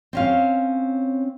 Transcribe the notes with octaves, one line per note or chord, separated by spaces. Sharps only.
C4 C#4 F5